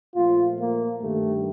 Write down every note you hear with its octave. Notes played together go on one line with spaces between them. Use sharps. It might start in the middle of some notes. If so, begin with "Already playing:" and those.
A#2 F3 A3 F4
A#3
G2 D#3 G3 A3